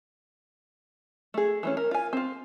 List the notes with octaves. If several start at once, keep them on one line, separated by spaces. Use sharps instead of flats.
A3 G#4
E3 A3 C#4
A#4
F4 G#5
C4 F4